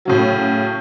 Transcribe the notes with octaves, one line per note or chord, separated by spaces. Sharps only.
A2 C#3 F#3